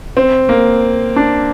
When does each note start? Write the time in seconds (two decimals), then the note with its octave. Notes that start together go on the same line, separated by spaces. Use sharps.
0.17 C4
0.49 A#3
1.16 D4